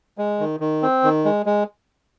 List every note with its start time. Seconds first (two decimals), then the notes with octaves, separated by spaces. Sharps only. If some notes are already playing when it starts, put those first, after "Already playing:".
0.18 G#3
0.39 D#3
0.60 D#3
0.83 C4
1.04 D#3
1.25 G#3
1.46 G#3